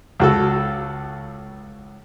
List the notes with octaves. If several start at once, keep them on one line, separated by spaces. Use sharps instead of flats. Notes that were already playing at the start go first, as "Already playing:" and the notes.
C#2 F#4 A4